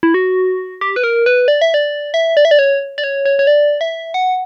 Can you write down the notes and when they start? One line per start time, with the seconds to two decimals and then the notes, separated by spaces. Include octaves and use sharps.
0.03 E4
0.14 F#4
0.81 G4
0.96 B4
1.04 A#4
1.26 B4
1.48 D5
1.61 E5
1.74 D5
2.14 E5
2.37 D5
2.45 E5
2.51 D5
2.59 C#5
2.98 D5
3.04 C#5
3.25 C#5
3.39 C#5
3.47 D5
3.81 E5
4.14 F#5